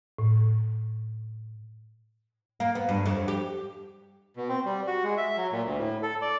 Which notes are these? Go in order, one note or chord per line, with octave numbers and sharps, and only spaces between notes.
A2
A#3
B3
G2
F2
G4
B2
C4
G3
F#4
G#3
E5
F#3
A#2
D2
A2
A4
D5